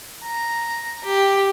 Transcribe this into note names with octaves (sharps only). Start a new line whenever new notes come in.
A#5
G4